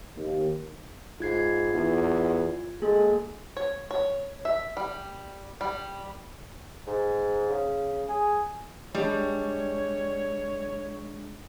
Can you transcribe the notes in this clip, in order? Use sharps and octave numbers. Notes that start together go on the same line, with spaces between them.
D#2
G#2 F4 G#6 C7
E2
G#3 A#3 G#4 A4
C#5
C#5
E5
G3
G3
G#2
C#3
G#4
G3 G#3 D4 C#5